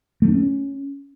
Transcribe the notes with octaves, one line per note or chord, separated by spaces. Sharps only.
A3
D4
C#4